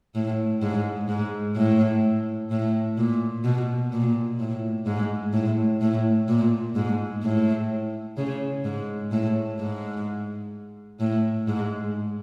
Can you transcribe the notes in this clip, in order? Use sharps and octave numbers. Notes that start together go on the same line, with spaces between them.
A2
G#2
G#2
A2
A2
A#2
B2
A#2
A2
G#2
A2
A2
A#2
G#2
A2
C#3
G#2
A2
G#2
A2
G#2